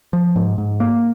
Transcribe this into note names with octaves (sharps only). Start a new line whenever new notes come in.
F3
G#2
G#2
A#3